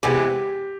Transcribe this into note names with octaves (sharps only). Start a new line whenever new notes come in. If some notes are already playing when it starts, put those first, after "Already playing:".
C3 E3 G#3 B3 G4